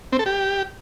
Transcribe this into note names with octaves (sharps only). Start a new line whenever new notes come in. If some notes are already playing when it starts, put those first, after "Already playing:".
C4
A4
G4